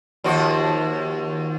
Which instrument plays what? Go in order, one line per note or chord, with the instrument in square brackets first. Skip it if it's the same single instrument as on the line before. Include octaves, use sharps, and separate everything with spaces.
[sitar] D#2 F3 F#4